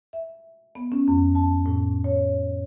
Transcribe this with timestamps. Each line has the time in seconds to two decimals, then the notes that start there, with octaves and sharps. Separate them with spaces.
0.13 E5
0.75 B3
0.92 C#4
1.08 F2
1.35 A5
1.66 A2
2.04 C#5